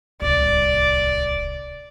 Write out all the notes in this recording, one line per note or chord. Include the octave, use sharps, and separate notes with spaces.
D1 C2 D5